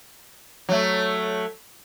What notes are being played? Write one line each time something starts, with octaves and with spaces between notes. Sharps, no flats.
F#3 A3